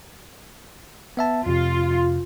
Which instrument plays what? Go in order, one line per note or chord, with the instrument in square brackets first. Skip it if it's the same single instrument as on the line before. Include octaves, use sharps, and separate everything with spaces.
[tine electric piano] B3 E5 A5
[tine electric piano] F2 C3 [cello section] F4